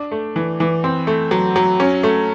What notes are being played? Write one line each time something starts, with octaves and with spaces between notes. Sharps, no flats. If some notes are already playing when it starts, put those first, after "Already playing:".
Already playing: D4
A3
E3
E3
C4
A3
F#3
F#3
C#4
A3